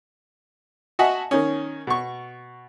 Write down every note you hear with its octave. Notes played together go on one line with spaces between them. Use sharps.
F#4 D#5 E5 F#5 G#5 A5
D#3 C#4
B2 C#6